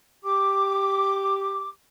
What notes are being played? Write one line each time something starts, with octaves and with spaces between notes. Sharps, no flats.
G4 D6